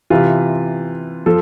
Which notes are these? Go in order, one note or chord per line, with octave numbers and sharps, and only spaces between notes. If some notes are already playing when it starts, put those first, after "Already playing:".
C3 E3 F4
F3 A4